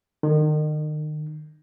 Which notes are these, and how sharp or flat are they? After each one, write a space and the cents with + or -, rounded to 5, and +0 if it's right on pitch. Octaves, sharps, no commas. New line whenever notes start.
D#3 -35